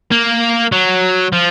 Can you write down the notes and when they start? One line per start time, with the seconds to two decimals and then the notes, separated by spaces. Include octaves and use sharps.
0.12 A#3
0.72 F#3
1.33 F3